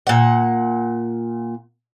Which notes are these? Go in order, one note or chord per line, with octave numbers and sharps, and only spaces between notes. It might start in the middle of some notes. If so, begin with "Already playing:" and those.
A#2 F#5